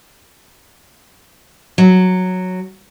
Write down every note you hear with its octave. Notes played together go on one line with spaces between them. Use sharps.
F#3